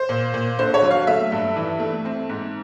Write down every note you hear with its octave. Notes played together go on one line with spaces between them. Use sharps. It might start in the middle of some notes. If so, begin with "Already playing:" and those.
Already playing: C5
A#2
A#2
D3 C5
C#5
F#3
F5
A3 E5
G2
E3
A3
C4
G#2